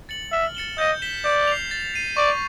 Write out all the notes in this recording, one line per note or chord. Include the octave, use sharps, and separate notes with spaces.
A6 C#7 F#7
E5 F6
A6 C#7 E7 G7
D#5 G6
B6 E7 G7
D5 G6
C7 F7
A6
C7 D#7
D5 C#6